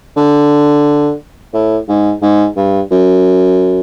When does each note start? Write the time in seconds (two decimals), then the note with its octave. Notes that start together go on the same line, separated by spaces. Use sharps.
0.16 D3
1.54 A2
1.88 G#2
2.22 G#2
2.57 G2
2.91 F#2